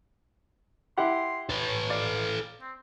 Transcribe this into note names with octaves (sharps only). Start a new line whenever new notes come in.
E4 G4 F#5 C6
A4 B4 C#5
D5 F5
C4